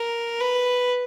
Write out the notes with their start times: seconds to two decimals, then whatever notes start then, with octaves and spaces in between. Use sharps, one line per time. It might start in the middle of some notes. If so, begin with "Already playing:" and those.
Already playing: A#4
0.40 B4